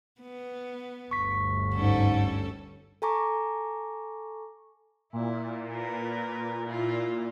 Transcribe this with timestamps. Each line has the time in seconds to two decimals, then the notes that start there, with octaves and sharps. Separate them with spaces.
0.21 B3
1.11 G1 D2 C#6 B6
1.74 G#2 G3 C#4 A4
3.02 A4 G#5 A#5 C#6 D6
5.13 A#2 E4
5.69 A#4 B4
6.65 A#3 E4 F4